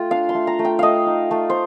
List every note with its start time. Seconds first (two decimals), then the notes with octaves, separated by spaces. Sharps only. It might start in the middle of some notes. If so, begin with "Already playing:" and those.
Already playing: A3 F4 G5
0.11 D4 F5
0.29 C6
0.35 A3
0.47 A#5
0.59 A3
0.65 G5
0.79 A3 D#5 F5
1.06 D#4
1.31 A3
1.50 C5